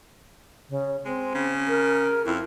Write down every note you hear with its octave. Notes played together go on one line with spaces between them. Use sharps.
C#3
G#3 C4
C#3
A#4
F2 E4